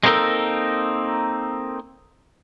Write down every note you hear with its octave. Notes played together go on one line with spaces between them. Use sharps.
G#3 A#3 C4 D#4 A4 A#4